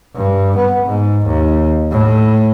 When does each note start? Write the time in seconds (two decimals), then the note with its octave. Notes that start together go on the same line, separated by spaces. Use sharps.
0.15 G2
0.57 B3
0.86 G#2
1.26 D#2
1.91 A2